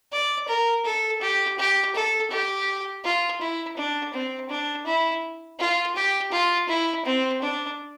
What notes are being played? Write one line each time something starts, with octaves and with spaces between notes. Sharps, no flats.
D5
A#4
A4
G4
G4
A4
G4
F4
E4
D4
C4
D4
E4
F4
G4
F4
E4
C4
D4